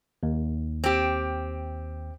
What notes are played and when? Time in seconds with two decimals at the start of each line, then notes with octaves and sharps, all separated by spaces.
0.23 D#2
0.84 C4 G4